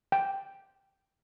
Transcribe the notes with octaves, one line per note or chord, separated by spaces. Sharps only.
G5